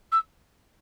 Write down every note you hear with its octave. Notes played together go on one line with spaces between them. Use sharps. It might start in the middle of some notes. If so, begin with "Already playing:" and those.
E6